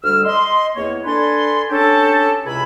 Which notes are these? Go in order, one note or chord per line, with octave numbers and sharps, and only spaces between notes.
D2 G3 E6 F6
D#5 C6
E2 A#3 C#5
D4 A4 B4 G#5 C6
C#4 D4 G4 A4
C#2 C3 E4 G#5 B5